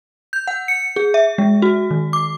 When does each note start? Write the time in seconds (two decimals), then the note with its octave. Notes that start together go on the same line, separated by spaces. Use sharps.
0.33 G6
0.47 F#5
0.68 C#7
0.96 G#4
1.14 E5
1.38 G#3
1.62 F#4
1.91 D#3
2.13 D6